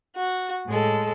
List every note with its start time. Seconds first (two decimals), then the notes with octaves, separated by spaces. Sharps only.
0.15 F#4
0.66 A2 G#3 A4